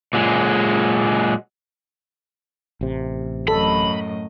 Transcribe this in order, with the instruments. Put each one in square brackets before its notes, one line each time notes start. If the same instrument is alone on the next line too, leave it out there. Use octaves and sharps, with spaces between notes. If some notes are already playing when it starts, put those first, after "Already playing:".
[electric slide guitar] A#2 F#3 G#3
[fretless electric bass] A1 C3
[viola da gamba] F#2 A2 D#5 [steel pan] A4 [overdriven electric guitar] B5